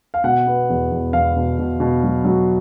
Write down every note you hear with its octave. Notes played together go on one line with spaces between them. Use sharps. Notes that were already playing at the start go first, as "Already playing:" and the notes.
F5
B2 F#5
B3
E2
E2
E2 F5
B2
B2
B2
F#3
F#3